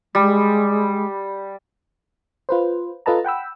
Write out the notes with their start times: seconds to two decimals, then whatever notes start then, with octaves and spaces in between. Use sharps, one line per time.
0.15 G3 G#3
2.49 F4 B4 C5
3.06 F4 A4 B4 D#5 A5 A#5
3.25 F#5 G5 B5 E6